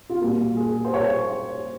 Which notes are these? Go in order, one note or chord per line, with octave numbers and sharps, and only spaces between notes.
F4
A#2 G3 A#3 F#4
G#4
C5
C#5